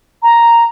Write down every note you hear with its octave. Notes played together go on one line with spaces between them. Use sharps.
A#5